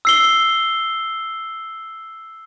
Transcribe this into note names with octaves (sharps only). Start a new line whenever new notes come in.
E6 C7 G7